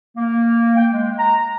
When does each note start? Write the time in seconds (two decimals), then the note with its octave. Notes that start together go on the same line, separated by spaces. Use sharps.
0.17 A#3
0.76 G5
0.93 G#3
1.18 A#5